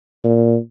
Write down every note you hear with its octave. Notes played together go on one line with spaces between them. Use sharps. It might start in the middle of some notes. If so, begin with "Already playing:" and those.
A#2